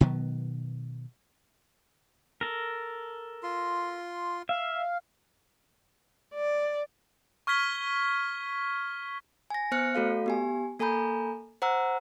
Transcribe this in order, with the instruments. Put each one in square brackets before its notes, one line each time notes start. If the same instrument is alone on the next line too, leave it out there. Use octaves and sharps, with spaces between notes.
[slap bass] B2 D#3 F#3 B3
[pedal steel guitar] A4 A#4
[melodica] F4 C6
[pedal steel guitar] E5 [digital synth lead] F5
[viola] D5
[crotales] C#6 F6 G#6 B6 G7
[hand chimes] G#5 A#6
B3 C5 F6 F#6 C#7
A3 F#4 A4 F5
B3 G4 G#5
A#3 A4 G#5 A#5 B5 G6
C5 F#5 A#5 E6